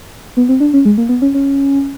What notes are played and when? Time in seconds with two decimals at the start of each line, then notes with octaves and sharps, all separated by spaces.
0.37 B3
0.49 C4
0.60 D4
0.74 C#4
0.85 G#3
0.98 A#3
1.09 B3
1.22 C#4
1.34 C#4